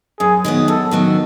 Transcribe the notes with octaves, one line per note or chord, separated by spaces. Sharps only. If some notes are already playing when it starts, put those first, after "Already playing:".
F#2 G#4
D#3 F#3 B3
F#2 A4
D#3 F#3 B3